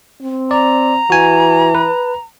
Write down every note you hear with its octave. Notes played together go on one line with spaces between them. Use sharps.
C4
D5 A#5
E3 F#4 G#5
B4